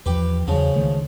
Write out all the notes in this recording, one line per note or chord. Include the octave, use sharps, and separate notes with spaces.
E2 F3 G4 B4
E2 C#3 F3 F#3
C#2 D#3 A3